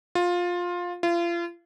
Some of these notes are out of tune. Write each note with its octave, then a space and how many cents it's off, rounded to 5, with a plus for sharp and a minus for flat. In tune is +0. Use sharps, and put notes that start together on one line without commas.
F4 +15
F4 -35